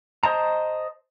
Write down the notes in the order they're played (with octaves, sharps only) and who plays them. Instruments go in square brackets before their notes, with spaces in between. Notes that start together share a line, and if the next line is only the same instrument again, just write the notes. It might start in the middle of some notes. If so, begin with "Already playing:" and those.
[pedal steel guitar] C5 D#5 A5 A#5